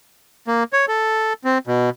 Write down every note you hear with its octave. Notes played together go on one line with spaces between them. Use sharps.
A#3
C#5
A4
C4
B2